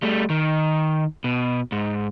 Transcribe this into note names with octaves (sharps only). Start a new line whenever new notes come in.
G3 A3
D#3
B2
G#2